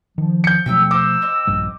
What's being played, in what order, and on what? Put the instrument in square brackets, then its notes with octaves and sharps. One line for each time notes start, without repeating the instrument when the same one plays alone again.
[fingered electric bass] D#3 [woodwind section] F3
[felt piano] G6 C#7
[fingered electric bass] B2 F3 A3 [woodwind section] F#3 [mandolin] E5 G5 E6
[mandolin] D#4 C5 [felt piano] D6 [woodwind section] E6
[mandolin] C4 D#5
[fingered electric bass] A#1 G2 G3